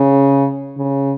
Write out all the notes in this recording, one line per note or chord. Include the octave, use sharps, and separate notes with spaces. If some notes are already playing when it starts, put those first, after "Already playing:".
Already playing: C#3
C#3